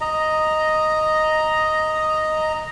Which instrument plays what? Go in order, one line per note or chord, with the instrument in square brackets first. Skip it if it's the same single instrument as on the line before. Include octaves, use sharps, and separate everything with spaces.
[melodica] D#5 A#5